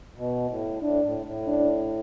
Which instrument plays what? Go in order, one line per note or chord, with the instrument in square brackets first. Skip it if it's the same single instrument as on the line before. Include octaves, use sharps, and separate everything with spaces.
[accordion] B2
A2
[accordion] A2 [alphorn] D4
[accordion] A2
A2
[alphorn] D4